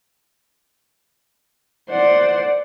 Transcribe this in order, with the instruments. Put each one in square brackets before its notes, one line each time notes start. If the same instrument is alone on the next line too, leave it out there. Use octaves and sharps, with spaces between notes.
[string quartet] C5 F#5 [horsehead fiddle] D5